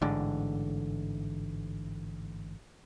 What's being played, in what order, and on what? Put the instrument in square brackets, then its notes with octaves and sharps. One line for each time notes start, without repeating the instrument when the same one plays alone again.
[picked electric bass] A1 G#2 D3